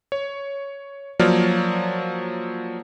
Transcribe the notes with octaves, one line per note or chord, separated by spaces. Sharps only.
C#5
F3 F#3 A#3 C#5 D5 F6